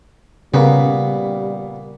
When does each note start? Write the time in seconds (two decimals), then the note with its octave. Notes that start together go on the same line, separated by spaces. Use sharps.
0.54 A#2 C#3 G3 B3